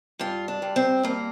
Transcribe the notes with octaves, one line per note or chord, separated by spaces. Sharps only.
G2 F4
D4
G2
C4
G2 A#3